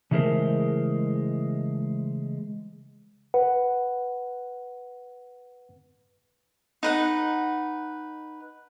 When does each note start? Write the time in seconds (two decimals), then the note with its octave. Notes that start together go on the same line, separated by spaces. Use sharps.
0.11 C#3 E3 G#3 A3 A#4 C5
3.34 B4 F#5
6.83 D#4 B4 F#5